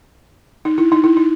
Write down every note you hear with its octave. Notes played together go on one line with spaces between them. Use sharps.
D#4
E4
D#4
E4
D#4